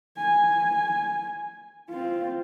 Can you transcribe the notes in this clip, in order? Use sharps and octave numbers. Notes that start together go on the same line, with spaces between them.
G#5
C4 F4